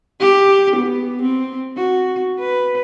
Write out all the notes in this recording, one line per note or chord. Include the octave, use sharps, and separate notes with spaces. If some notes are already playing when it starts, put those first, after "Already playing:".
G4
B3
C4
F#4
B4